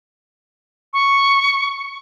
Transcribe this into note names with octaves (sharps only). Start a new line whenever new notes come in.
C#6